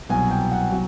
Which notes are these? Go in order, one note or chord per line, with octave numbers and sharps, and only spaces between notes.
C2 B2 F#3 G#5
G5
F#5
B2 F#3